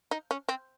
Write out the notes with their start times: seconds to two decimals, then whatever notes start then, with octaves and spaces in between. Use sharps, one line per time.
0.11 D#4
0.31 C#4
0.49 C4